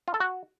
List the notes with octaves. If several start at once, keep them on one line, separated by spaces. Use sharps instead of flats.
F4
A4
F#4